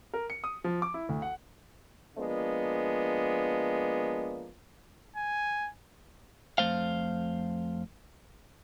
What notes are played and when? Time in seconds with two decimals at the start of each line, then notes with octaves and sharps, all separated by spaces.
0.14 A#4
0.30 C#7
0.44 D#6
0.64 F3
0.82 D6
0.94 E4
1.09 D2
1.22 F#5
2.18 F3 G#3 A#3 B3 D4
5.16 G#5
6.58 F2 G#2 A3 C5 F5